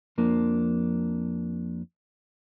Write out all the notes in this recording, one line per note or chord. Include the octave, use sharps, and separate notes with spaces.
F2 F3 A#3 D4